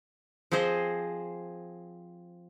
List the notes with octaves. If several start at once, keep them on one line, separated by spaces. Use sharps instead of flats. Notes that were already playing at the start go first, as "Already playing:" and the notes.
F3 C4 G#4 C5 D#5